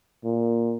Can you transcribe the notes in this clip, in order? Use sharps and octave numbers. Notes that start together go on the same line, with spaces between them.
A#2